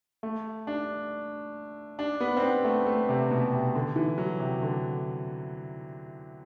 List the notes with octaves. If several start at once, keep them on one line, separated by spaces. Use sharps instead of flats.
A3
D4
D4
B3
C4
B3
A3
A3
C3
B2
C3
D3
E3
F#3
C3
D3